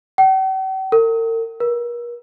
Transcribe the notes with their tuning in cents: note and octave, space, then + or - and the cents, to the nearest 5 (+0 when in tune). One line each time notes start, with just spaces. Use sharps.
G5 -45
A#4 -45
A#4 +40